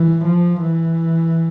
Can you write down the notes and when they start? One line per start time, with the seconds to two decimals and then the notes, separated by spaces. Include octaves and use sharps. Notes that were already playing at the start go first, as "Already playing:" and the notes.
Already playing: E3
0.24 F3
0.61 E3